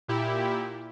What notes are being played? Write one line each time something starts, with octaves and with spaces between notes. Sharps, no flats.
A#2 E4 G4